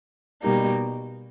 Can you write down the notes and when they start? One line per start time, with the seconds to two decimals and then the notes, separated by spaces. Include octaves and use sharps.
0.41 B2 G3 A#3 D#4